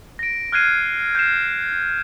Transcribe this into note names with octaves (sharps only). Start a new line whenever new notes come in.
A#6 D7
F6 F#6 G#6 C7 D#7
G6 G#6 C7 E7